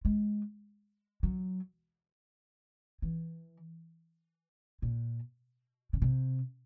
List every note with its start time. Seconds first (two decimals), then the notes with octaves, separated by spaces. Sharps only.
0.05 G#3
1.23 F#3
3.02 E3
4.82 A#2
5.93 C#3
6.02 C3